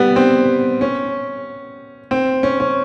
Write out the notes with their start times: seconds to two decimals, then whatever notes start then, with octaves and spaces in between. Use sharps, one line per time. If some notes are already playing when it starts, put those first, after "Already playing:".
Already playing: G3 B3
0.16 C4
0.81 C#4
2.11 C4
2.43 C#4
2.60 C#4